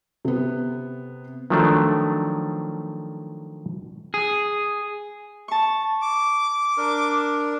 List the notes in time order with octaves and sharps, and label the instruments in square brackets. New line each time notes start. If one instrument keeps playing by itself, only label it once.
[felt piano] C3 B3
[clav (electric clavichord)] D#3 F3 F#3 A3 D4
[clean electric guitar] G#4
[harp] A5 C#6
[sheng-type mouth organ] D6
[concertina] D4 A#4